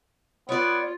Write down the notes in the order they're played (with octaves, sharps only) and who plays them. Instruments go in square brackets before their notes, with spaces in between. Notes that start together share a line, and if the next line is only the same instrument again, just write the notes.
[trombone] B3 [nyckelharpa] F4 [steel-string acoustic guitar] C#5 D5